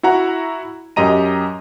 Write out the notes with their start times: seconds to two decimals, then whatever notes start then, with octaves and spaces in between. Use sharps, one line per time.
0.03 E4 F#4 F#5 A#5
0.96 F#2 G4 D#5 A#5 D#7